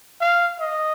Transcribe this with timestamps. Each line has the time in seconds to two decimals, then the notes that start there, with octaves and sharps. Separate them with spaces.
0.21 F5
0.59 D#5